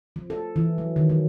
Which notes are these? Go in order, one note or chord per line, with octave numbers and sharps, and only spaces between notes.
F3
A4
E3
F#3
D#3
F#3